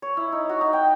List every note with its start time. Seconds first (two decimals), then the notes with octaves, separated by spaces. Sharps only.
0.02 C#5
0.17 E4
0.32 D#4
0.49 F#4
0.61 D#4
0.73 G5